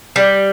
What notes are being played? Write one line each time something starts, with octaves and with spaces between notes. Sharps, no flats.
G3